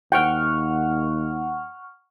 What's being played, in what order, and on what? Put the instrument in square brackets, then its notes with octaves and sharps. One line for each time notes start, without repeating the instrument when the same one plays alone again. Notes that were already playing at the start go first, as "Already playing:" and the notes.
[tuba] D#2 [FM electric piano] F#5 C#6 F6 [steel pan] G5